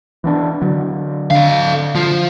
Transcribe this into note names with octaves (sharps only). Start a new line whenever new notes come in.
E3 B3 D4
D3 F#3
D3 A4 F5
F3 F4